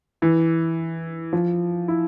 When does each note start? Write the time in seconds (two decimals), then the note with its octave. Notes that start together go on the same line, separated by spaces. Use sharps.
0.22 E3
1.33 F3
1.88 E4